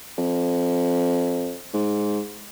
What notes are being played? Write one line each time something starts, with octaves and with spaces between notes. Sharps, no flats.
F2
G#2